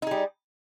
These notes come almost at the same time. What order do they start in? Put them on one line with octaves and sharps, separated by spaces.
D#4 G#4 G3